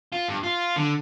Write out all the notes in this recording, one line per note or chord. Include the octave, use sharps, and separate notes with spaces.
F4
G2
F4
D3